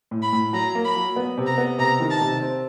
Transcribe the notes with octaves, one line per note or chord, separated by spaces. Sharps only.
A2
B5
A2
F#3 A#5
A#3
B5
F#3
B3
C3
A#5
B3
C3 A#5
D#3
A5
C3
C4